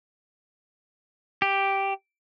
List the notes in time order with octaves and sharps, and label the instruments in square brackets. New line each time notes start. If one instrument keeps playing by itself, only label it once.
[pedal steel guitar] G4